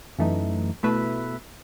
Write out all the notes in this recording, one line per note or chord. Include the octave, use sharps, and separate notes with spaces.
F#2 E3 A3 D#4
B2 A3 E4 B4 E5